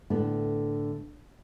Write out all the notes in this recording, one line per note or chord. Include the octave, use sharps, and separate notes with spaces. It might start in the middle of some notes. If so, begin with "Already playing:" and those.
A2 D3 B3 E4